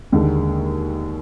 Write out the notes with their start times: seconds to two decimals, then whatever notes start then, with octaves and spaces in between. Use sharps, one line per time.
0.12 D#2 D3 G#3